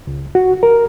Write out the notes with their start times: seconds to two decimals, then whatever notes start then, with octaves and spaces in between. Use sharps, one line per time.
0.07 C#2
0.35 F#4
0.63 A#4